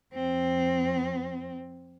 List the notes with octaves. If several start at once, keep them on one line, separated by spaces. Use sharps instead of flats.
F2 C4